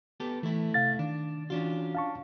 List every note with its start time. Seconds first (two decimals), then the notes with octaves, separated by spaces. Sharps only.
0.20 B3 G4 A4
0.43 E3 A3 E4
0.74 C3 F5 A6
0.99 D#3 D4
1.50 E3 C#4 D4 F4 F#4
1.95 F5 A5 C#6